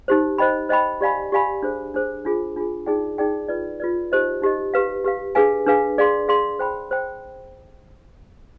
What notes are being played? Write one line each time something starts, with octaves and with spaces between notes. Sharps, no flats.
D#4 G4 C5
C5 D#5 G5 B5
C5 D#5 G5 B5
G4 D5 F5 G#5 B5
G4 D5 F5 G#5 B5
D4 G#4 C5
D4 G#4 C5
D4 F4 G#4
D4 F4 G#4
D#4 G#4 D5 G5
D#4 G#4 D5 G5
F4 B4 D5
F4 B4 D5
D#4 G4 C5 D#5
D#4 G4 C5 D#5
G4 B4 F5
G4 B4 F5
D4 G#4 B4 F5 G#5
D4 G#4 B4 F5 G#5
G#4 D5 F5 C6
G#4 D5 F5 C6
C5 G5 B5
C5 G5